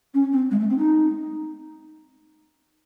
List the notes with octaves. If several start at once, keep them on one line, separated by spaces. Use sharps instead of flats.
C#4
C4
G#3
A3
C4
D#4